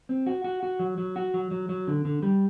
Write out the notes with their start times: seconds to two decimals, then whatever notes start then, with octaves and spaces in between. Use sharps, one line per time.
0.09 C4
0.27 F#4
0.44 F#4
0.63 F#4
0.79 F#3
0.98 F#3
1.16 F#4
1.34 F#3
1.51 F#3
1.69 F#3
1.87 D3
2.05 D3
2.23 G3